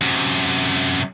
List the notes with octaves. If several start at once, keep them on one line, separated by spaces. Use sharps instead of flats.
F#2 C3